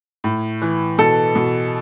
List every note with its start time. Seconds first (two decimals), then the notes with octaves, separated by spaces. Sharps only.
0.24 A2
0.62 E3
0.98 B2 A4
1.35 B2